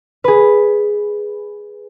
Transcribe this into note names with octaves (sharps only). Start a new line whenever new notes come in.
G#4 B4